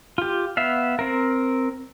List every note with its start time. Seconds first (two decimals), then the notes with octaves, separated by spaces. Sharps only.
0.18 F4 G4
0.57 B3 E5 F5
0.99 C4 A#4